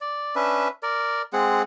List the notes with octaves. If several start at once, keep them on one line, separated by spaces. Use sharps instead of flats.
D5
C#4 D4 B4 E5
A#4 D5
G#3 C4 G#4 F#5